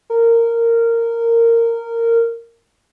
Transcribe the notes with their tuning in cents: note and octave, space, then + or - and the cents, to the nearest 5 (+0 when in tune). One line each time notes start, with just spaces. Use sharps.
A#4 -15